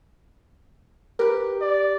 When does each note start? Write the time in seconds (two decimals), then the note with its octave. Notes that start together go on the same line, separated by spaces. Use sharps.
1.19 G4 A#4 B4
1.61 D5